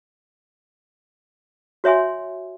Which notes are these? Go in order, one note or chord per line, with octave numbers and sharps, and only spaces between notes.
F#4 C#5 E5 G#5 C6